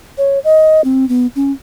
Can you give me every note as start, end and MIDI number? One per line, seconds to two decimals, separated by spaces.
0.18 0.39 73
0.44 0.81 75
0.84 1.08 60
1.09 1.27 59
1.36 1.51 61